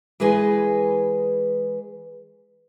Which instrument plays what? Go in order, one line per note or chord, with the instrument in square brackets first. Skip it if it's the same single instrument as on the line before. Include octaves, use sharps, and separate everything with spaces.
[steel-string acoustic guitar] E3 G#3 G#4 B4 D#5 G#5